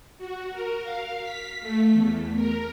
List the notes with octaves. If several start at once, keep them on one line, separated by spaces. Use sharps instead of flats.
F#4
A#4
F5
B6
A3
E2
A#4